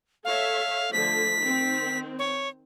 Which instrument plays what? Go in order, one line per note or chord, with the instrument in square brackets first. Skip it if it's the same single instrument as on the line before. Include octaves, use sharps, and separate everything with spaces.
[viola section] A4 C#5 E5 [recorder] F5
[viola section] D3 F3 A3 [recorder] B6
[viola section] D#3 C4
[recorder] C#5